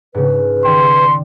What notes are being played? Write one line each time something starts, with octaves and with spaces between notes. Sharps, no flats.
G#2 C#3 B4
D#3 D5 G5 C6